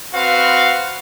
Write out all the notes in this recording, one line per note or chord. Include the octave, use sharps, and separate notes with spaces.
C4 F#4 B4 F5